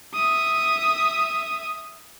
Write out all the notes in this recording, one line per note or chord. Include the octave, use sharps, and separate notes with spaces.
E5 D#6